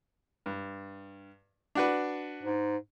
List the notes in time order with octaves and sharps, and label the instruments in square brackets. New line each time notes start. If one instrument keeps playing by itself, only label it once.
[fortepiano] G2
D4 F#4 B4
[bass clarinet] G#2